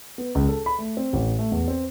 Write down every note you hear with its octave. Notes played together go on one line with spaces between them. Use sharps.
B3
C#2
A4
B5
A3
C4
A1
A3
E2
C4